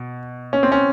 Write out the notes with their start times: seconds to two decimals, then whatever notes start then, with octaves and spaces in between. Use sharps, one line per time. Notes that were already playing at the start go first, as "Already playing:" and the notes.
Already playing: B2
0.53 C#4
0.63 C4
0.72 C#4